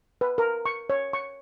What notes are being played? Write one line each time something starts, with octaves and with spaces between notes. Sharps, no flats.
B4
A#4
C#6
C#5
C#6